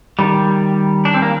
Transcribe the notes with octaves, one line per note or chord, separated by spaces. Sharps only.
D#3 G3
D4
C4
A#3